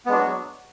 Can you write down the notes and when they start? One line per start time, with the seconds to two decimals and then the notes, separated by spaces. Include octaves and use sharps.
0.06 B3
0.09 G#3
0.12 D4
0.15 F#4
0.18 F#3